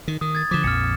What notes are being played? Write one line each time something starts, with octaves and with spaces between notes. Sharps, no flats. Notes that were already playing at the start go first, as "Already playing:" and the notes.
D#3
D#3 D#6
G#6 A6
D3 F3 D6 B6 E7
A#1 F2 F6 A6 C#7